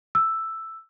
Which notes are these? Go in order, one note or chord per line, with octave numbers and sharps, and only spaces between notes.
E6